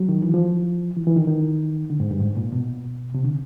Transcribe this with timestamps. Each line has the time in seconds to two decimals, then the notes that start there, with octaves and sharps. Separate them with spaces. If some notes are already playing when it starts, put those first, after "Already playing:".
Already playing: F#3
0.09 D#3
0.22 E3
0.34 F3
0.97 E3
1.07 E3
1.17 D#3
1.27 D#3
1.90 D3
2.00 G#2
2.11 G2
2.20 G#2
2.37 A#2
2.53 B2
3.15 C3
3.24 D3